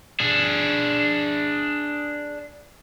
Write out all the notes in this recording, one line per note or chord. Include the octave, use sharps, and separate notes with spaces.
D4 G#4